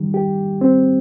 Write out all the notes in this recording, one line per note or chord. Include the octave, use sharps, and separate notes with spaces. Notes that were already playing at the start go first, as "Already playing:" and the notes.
Already playing: D#3 G3
G4
C4